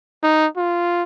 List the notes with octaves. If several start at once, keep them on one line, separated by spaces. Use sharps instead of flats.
D#4
F4